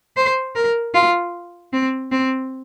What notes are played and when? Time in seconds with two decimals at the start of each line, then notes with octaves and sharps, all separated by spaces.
0.17 C5
0.55 A#4
0.94 F4
1.73 C4
2.11 C4